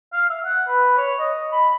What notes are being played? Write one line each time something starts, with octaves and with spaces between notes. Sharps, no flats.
F5
E5
F#5
B4
C#5
D#5
B5